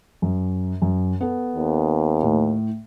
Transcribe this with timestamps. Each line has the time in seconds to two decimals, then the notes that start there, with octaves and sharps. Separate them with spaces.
0.22 F#2
0.82 F#2
1.21 B3 A4
1.56 D#2
2.23 A2